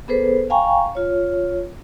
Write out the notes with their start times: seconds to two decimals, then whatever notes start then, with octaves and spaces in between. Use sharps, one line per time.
0.08 B3 G#4 A4 B4 C5
0.50 F5 G5 G#5 A#5 C#6
0.95 F4 C#5